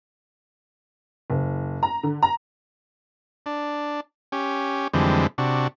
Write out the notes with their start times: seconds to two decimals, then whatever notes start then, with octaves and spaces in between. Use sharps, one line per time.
1.30 F#1
1.83 A#5
2.03 D3
2.23 A#5
3.46 D4
4.32 C#4 G4
4.94 F2 D3 E3 G3 G#3 C4
5.38 C3 D4 F#4